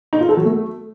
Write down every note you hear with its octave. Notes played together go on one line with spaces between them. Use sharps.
D#4
F4
A4
F#3
A3